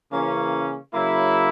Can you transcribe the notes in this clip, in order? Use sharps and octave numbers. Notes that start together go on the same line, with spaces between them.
C#3 E3 A#3 C#4
C#3 F#3 A#3 E4